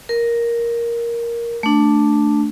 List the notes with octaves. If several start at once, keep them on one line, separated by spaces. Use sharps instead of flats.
A#4
A3 D4